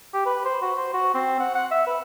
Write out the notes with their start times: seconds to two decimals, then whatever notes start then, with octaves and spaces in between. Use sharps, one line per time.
0.14 G4
0.26 B4
0.45 C5
0.62 F#4
0.77 C5
0.94 F#4
1.14 C4
1.40 F#5
1.55 F#5
1.71 E5
1.87 B4